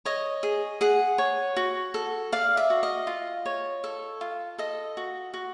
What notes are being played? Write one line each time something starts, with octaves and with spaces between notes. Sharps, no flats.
C#5 D#5
G#4
G#4 F#5
C#5
F#4
A4
D5 F5
E5
F#4
D#5
F4
C#5
A4
F4
A4 D#5
F#4
F#4